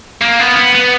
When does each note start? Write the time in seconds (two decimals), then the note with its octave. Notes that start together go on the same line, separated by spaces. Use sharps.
0.21 A#3
0.39 B3
0.56 B3
0.75 B3